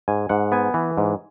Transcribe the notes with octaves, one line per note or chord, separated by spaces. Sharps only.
G#2 G#5
G#2 F#5
B3 G#5
E3
G#2